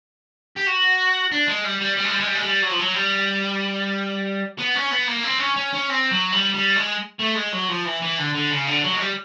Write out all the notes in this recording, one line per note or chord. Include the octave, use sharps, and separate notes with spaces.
G4
F#4
D4
G#3
G3
G3
G3
G#3
G3
G#3
G3
G#3
G3
F#3
F3
F#3
G3
B3
C#4
B3
A#3
C4
C#4
C#4
C#4
C4
F#3
G3
G3
G#3
A3
G#3
F#3
F3
E3
E3
D3
D3
C#3
D3
F#3
G#3
G3